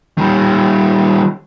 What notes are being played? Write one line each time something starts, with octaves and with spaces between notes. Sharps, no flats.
D#3 G3